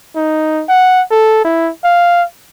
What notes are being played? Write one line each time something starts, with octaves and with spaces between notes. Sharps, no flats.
D#4
F#5
A4
E4
F5